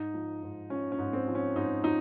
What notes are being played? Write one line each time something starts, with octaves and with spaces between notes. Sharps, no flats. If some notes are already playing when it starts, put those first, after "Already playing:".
Already playing: G#2 D#4
F3
G#2
F3 C#4
C#4
G#2
C4
F3
C#4
G#2 D#4
F3 D#4